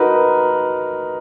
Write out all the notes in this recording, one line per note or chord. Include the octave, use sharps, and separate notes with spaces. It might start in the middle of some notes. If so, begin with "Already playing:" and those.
Already playing: D#4 F#4 A#4 B4